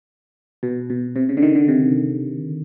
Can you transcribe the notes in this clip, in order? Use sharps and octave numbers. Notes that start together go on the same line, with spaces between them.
B2
B2
C3
C#3
D3
D#3
D3
C3